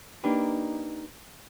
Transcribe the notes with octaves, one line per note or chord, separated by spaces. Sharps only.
A#3 D4 D#4 G4 B4